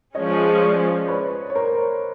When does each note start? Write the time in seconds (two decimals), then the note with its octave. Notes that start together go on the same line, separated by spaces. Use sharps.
0.15 F3 G#3 C#4 C#5 D#5
0.62 C5 D5
1.08 B4 C#5
1.50 C#5
1.55 A#4 C5